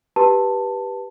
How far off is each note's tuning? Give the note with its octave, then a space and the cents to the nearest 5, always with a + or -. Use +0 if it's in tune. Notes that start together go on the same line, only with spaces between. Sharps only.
G4 -5 B4 -15 A5 +10